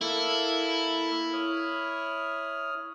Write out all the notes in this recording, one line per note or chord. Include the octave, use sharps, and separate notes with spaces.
A#3 E4 A4
C#5 D#6 F6